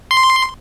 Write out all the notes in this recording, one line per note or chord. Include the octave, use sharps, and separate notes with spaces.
C6